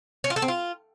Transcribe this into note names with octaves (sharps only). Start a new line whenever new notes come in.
C#4
F4
A4
C4
F4